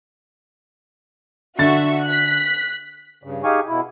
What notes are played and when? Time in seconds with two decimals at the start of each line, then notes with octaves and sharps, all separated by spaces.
1.59 D3 F#4 E5 C#6 A6
2.05 F#6 B6
3.24 G2 C#3
3.44 D#4 G4 G#4 F5 G#5 C#6
3.68 B2 E4